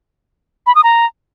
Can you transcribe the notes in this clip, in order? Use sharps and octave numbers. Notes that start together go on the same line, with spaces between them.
B5
D#6
A#5